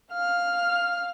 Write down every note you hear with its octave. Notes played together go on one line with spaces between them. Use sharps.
F5 F6